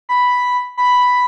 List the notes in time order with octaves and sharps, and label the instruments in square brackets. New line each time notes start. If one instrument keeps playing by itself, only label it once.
[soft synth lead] B5
B5